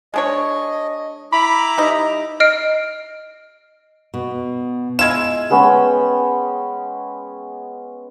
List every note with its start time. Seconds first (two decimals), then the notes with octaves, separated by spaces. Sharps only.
0.14 G#3 D4 C#5 D#5
1.32 E4 A#5 B5 D6
1.77 G3 D#4 D#5
2.40 D#5 F6 C7 D7
4.14 B2
4.99 G#3 E4 F4 G#6 E7
5.50 G#3 B3 C#4 G5